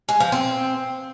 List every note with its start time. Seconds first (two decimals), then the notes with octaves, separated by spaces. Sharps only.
0.09 G#3
0.20 F3
0.32 C4